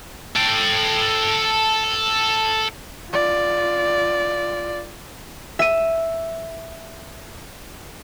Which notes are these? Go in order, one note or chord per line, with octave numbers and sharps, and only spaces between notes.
A4 G5
F4 D5
E5 D#7